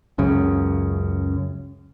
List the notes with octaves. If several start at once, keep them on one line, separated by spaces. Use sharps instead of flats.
C#2 F#2 C#3